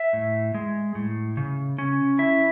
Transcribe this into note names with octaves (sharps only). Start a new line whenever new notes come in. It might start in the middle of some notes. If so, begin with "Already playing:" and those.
Already playing: E5
A2
G#3
A2
C#3
C#4
E4 E5